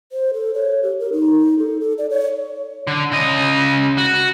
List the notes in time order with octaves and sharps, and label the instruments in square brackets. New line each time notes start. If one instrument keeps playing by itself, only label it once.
[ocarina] C5
A4
C#5
G4
A#4
D#4
A4
A4
D5
C#5
[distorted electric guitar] D3
C#3 D#5
F#4